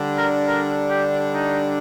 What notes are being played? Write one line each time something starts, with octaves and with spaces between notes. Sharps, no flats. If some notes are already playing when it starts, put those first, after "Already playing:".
Already playing: D3 G3 D4
A#4
A#4
G4
D#4